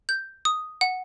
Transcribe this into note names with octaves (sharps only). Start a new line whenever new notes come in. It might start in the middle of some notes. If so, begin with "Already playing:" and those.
G6
D#6
F#5